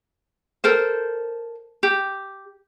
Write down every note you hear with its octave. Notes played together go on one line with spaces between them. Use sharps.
A4 A#4 C5
G4